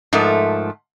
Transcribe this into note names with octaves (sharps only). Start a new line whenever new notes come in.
G#2 F3 A3 A#4